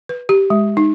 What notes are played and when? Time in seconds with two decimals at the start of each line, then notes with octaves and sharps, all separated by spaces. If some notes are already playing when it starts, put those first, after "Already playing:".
0.09 B4
0.29 G4
0.50 G#3
0.77 D#4